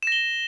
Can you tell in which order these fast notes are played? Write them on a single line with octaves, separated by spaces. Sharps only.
E7 A#6 G7